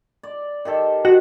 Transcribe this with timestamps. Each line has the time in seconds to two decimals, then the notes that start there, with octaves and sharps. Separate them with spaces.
0.23 D5
0.65 D#3 G4 A4
1.05 D#3 F#4